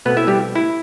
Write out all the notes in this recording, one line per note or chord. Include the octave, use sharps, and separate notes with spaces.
B2 A3 B3 C4 B4
E4 E5
G3 G4
E4